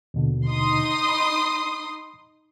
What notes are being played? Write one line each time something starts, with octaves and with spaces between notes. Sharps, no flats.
D#2 B2 D3
D#4 C6 D#6
B5